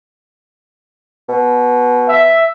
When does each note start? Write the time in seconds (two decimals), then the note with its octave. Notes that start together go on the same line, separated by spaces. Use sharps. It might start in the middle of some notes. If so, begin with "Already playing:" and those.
1.29 B2
2.08 E5